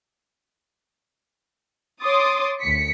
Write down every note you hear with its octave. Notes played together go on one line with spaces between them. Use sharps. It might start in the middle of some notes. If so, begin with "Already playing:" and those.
C#5 C6 D6 D#6 A6
D2 B6 C#7